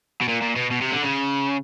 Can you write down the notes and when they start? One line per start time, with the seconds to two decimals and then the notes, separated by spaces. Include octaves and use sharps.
0.22 B2
0.29 A#2
0.42 A#2
0.56 B2
0.71 B2
0.81 C3
0.92 D3
1.03 C#3